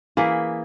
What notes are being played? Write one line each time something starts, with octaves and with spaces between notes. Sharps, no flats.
E3 A#3 E4 G#4